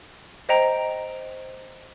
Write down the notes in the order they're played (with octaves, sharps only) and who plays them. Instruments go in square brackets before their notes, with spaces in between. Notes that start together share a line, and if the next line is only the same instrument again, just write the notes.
[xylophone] C5 D#5 G5 A#5 D7